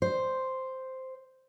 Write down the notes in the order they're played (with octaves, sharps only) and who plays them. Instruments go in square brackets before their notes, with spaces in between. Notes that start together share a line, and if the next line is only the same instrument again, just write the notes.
[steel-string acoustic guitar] C5